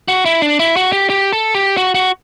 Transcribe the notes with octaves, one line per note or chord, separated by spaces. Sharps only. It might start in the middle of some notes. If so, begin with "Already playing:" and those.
F#4
E4
D4
E4
F#4
G4
G4
A4
G4
F#4
F#4